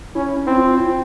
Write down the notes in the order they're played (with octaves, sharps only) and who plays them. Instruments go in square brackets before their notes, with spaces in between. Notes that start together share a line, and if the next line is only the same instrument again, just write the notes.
[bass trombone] C#4 [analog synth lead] E4
[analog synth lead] C#4
[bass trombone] C4 [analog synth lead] E4
[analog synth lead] F4
E4
F4